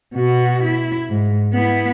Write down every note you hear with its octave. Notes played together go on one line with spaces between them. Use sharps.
B2 F#4
E4
G#2
B3 E4